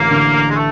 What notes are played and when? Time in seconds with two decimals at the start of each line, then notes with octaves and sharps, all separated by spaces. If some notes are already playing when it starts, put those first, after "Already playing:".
Already playing: A1 D3 A#3
0.10 D3
0.50 G#3
0.55 A3